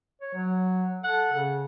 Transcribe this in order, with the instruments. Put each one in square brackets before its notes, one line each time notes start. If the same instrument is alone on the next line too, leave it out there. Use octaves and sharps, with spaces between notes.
[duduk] C#5
F#3
[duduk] A4 [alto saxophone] F#5
[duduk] C#3